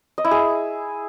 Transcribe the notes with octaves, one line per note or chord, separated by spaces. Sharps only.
D#5
E4
G#4